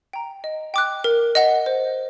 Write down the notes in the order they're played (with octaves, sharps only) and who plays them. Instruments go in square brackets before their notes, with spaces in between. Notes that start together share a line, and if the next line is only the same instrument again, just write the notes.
[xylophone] G5 A#5
D#5
G5 D6 F#6
A#4
D#5 F#5
C5